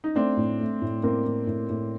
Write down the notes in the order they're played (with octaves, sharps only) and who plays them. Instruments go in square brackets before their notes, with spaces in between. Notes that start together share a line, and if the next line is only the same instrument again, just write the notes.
[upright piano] D#4
[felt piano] A3 [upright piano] C4 D4
[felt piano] A2
A3
A2
[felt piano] A2 [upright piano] A#3 C4
[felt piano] A2
A2
A2